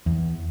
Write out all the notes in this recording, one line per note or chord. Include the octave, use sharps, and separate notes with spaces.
E2